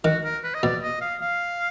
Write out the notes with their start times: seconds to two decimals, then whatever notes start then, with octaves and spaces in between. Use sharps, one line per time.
0.04 D#3 F#4
0.24 A#4
0.44 B4
0.54 D#5
0.63 B2 D5
0.83 D#5
1.01 F5
1.21 F5